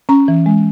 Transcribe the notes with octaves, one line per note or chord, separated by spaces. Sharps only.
C#4 A#5
E3
G#3